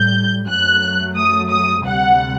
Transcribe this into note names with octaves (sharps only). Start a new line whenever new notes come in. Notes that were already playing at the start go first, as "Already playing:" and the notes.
Already playing: A2 G3 G6
F#2 F#3 A3 F#6
D#6
D#6
D2 C3 G3 F#5